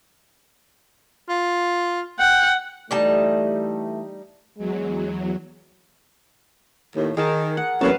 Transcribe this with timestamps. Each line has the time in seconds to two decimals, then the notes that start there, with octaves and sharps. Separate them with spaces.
1.29 F4
2.19 F#5 G5
2.91 E3 G3 A3 D#4 A5
4.58 E2 F#3 G#3
6.95 D#2 A2
7.17 D#3 G#4 A#4 A5
7.57 F#5
7.81 E2 A2 F#3 A#3 C#4 B4 F5 A5